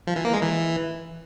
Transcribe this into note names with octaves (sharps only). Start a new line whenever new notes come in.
F3
E3
A#3
G#3
E3